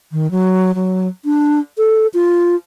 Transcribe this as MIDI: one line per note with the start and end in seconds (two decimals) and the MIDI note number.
0.12 0.30 51
0.31 0.71 54
0.75 1.08 54
1.25 1.59 62
1.78 2.07 69
2.14 2.55 65